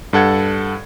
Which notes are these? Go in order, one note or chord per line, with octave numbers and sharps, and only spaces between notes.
G2 A4 F#5 G#6